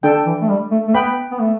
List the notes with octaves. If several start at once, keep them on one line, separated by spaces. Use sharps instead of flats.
D3 D4 A4 G5
E3
A3
G3
A3
A3
B3 B4 G5 B5
B3
A3